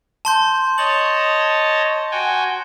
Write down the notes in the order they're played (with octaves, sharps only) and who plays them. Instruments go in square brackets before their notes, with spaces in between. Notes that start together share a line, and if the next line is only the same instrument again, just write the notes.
[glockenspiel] A5 C6 G6
[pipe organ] C#5 D#5 A5 [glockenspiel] F#7
[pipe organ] F#4 G5 G#5